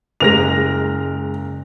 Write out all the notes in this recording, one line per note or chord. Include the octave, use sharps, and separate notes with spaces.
F#1 G#3 A#4 A#6 F7